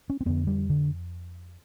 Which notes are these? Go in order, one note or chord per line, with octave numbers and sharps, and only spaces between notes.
C#4
C4
F2 D3 B3
G3
D3